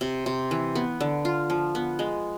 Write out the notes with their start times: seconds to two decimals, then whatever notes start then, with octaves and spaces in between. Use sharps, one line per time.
0.01 C3
0.26 C3
0.51 E3
0.75 B3
1.01 D3
1.25 F4
1.50 F3
1.75 B3
1.99 G#3